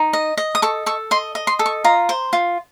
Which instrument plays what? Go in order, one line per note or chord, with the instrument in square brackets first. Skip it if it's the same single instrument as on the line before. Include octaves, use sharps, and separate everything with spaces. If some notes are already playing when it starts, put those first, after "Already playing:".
Already playing: [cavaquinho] D#4
D#5
D#5
D#6
A4 C#6
A4 C#6
D#5 C6
D#5
C6
A4
C#6
F4 A#5
C5
F4